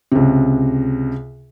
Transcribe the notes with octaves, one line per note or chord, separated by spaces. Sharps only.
C#2 C3